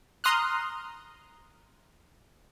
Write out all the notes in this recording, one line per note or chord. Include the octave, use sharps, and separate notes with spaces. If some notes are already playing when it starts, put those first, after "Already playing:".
A#5 C6 D#6 F6 F#6